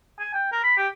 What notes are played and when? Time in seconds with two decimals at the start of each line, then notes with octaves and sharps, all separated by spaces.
0.20 G#5
0.34 G5
0.52 A#4
0.64 B5
0.77 G4